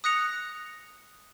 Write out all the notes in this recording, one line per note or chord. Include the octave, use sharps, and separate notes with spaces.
D#6 F#6 A#6 C#7 F7